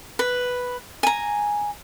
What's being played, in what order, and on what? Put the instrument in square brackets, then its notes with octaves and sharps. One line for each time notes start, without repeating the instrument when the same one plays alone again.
[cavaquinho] B4
G#5 A#5